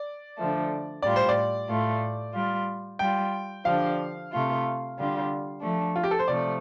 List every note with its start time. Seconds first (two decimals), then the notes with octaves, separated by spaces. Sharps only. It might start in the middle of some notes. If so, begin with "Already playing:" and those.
Already playing: D5
0.38 D3 F3 A3
1.02 A2 G3 F4 D5
1.16 C5
1.29 D5
1.68 A2 A3 F4
2.34 G3 F4
2.99 G3 F4 G5
3.64 D3 F3 D4 G4 F5
4.31 C3 A3 F4
4.97 D3 G3 F4
5.61 F3 A3 D4
5.96 F4
6.04 G4
6.11 A4
6.19 C5
6.28 C3 F3 A3 D5